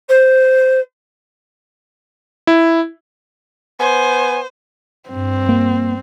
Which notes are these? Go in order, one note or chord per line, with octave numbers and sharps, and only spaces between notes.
C5
E4
B3 C5 G#5
G2 C4
A#3